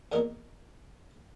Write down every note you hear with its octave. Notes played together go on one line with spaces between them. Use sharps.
E2 A#2 D#4 A#4